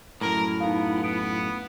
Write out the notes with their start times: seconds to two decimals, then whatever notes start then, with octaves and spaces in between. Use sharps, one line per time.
0.21 F#2 A2 E4 A#4
0.60 B3 D#4 F5
1.04 B3 D7